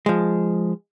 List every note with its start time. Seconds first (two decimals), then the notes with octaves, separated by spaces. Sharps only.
0.06 F3 G#3